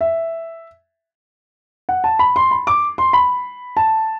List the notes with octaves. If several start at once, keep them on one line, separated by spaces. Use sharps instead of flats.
E5
F#5
A5
B5
C6
B5
D6
C6
B5
A5